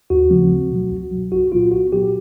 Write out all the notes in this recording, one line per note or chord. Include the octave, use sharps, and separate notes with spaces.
D#2 F#4
C#3 F3 A3 C4
C#2
B2 F#3
C#2
B2 F#3
C2 F#4
A#2 F#3 B3 F4
C2 F#4
A#2 F#3 B3 G4